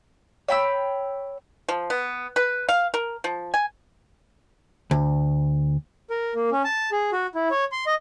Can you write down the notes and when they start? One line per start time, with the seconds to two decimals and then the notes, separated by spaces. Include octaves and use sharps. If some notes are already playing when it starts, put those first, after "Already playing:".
0.48 C#5 G5 B5 E6
1.68 F3
1.90 B3
2.36 B4
2.69 F5
2.94 A#4
3.24 F3
3.54 G#5
4.91 D2
6.10 A#4
6.35 A#3
6.52 C#4
6.64 A5
6.92 G#4
7.13 F#4
7.35 E4
7.51 C#5
7.72 C6
7.87 D#5